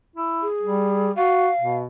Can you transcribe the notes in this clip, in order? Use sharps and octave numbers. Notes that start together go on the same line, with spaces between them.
E4
G#4
G3
F#4 F5
B2